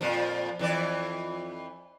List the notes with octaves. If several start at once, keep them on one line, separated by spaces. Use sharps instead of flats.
F2 A#2 F3
F2 E3 D5